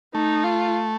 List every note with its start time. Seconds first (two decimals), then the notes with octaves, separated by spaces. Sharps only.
0.14 A3 D#4
0.44 F4